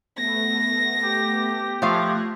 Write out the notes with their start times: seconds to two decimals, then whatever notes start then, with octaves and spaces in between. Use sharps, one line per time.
0.18 A3 B3 A#6
1.02 G4
1.82 F3 A3 F5 F#6 G#6 A#6